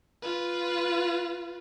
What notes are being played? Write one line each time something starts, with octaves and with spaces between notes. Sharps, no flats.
F4 B4